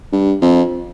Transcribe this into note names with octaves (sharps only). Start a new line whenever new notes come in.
G2
F2